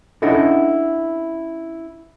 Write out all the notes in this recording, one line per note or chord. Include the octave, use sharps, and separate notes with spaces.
C#4 D4 E4 A4 D#5 F#5